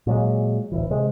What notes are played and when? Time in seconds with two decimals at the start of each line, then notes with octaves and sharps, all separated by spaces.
0.07 A#2 F#3 G#3
0.72 D1 E2 E3
0.90 C3 G#3